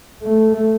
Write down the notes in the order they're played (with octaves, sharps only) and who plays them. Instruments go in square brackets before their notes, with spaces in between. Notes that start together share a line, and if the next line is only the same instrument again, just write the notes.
[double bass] A3